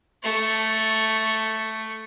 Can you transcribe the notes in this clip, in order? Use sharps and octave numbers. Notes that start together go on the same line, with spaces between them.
A3 C#6